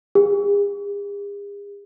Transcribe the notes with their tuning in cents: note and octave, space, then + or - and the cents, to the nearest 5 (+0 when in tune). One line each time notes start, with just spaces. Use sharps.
G#4 -45